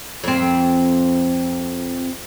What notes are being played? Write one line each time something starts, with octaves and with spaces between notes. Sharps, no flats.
F2 C4